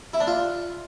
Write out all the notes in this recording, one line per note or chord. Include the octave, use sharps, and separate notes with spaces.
E4
D4
F4